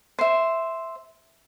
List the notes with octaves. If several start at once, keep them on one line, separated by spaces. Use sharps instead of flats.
C5 E5